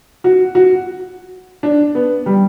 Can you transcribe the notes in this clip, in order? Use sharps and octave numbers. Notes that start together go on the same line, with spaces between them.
F#4
F#4
D4
B3
G3